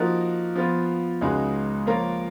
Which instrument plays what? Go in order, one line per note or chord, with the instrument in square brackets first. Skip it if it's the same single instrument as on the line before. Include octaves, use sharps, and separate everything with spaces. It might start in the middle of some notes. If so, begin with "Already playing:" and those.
Already playing: [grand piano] F3 A#3 D#4 F#4 A#4
F3 B3 F4
C#2 C#3 G#3 D#4 F#4
F3 A#3 F4 A#4 C#5